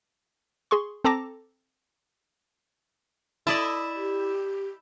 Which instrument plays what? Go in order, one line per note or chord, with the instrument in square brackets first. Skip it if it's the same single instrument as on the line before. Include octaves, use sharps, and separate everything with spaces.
[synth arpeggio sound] G#4 C6 C#6
C4 A4 A5 A#5 D6 A#6
[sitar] E4 [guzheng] D5 D#5 A5
[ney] G4